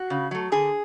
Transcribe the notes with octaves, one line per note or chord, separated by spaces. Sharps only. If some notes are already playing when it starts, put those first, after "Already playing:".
Already playing: F#4
C#3
F#3 A3
D3 G#4